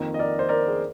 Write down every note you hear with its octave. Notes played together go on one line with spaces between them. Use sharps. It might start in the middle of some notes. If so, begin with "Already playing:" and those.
Already playing: F2 D#3 A#3
D#5
A#4 D5
C5
A#4 D5
G#4